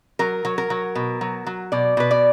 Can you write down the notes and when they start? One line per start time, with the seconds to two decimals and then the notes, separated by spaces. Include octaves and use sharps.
0.19 F#3 A#4
0.45 F#3
0.58 A#4
0.70 F#3
0.95 B2
1.21 F#3
1.46 F#3
1.72 B2 D5
1.97 B2 B4
2.11 D5